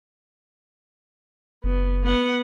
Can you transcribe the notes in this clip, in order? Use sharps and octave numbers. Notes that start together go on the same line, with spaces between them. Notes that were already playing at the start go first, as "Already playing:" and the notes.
F#1 B3
B3 F#5